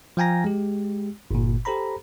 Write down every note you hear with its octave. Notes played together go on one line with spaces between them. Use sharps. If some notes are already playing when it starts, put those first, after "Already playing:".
F3 F5 G5 G#5 A#5 A#6
G#3 G4
G1 A#2
G4 A4 C5 A#5 B5